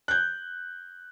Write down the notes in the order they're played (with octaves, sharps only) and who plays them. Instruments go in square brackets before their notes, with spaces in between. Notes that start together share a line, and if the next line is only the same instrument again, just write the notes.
[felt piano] F#6 G6